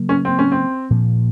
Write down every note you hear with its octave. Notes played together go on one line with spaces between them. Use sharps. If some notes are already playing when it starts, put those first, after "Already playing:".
Already playing: C#3 F#3 A#3
C#4
C4
C#4
C4
A#2 F3 A#3